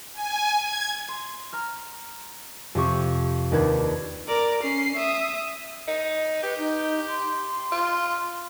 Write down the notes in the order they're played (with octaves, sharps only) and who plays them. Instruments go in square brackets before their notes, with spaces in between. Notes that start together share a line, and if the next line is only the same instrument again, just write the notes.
[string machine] G#5
G#6
[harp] C6
A#5 F6
F2 C3 G4 C#6
D#2 D4 B4 A5 G#6
[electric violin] A#4 D5
C#4 C7
E5 D#6
[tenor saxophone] D#4
[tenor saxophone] G4 [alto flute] B4
[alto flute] D#4
C6
[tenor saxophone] F4